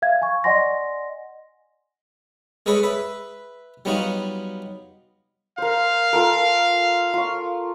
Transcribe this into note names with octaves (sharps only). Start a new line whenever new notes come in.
E5 F5 G#6
G#5 C#6
D5 D#5 F#5 G#5 C6 A#6
G#3 G#4 A4 B4 C#5 D#5
B4 E5
F#3 G3 B3 D#4 F4 F#4
A#4 C5 F5
F4 A4 A#4
F4 C#6